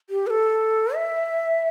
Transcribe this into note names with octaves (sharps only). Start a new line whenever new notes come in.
G4
B4
A4
E5